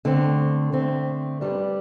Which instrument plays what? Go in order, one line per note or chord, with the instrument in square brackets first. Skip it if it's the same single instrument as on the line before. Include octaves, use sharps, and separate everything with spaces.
[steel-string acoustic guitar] D3 A3 C4
D3 A3 C4
G2 G3 D4